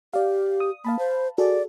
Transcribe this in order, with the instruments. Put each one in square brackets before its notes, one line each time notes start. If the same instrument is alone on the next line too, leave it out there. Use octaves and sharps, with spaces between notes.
[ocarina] G4 [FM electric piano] D5 F5
[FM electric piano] D#6
[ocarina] A#3 [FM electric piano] F5 A5 B5
[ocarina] C5
[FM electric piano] F#4 G#4 A4 [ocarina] D5